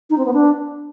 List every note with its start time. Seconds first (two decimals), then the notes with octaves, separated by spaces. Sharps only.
0.10 D#4
0.18 C4
0.26 B3
0.33 D4